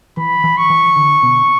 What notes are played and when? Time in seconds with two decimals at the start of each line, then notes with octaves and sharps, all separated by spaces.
0.17 E3 B5
0.44 E3
0.58 C#6
0.70 E3
0.96 D3
1.23 B2